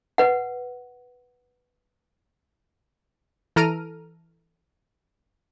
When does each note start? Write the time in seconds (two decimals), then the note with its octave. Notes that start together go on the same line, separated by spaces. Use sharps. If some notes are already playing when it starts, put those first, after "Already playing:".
0.18 B4 F#5
3.56 E3 A4 A#5 F6 D7 D#7